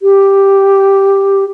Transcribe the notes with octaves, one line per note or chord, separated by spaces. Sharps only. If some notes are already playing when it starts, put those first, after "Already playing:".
G4